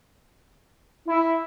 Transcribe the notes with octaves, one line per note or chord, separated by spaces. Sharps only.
E4